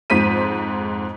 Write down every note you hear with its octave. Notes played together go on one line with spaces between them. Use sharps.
F2 G#2 C5 B6 D#7